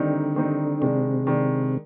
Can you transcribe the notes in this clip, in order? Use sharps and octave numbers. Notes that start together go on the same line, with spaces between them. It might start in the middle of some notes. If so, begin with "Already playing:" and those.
Already playing: D3 D#3 G3 C4 D#4
D#3 G3 C4 D#4
C3 D#3 G#3 D4
D#3 G#3 D4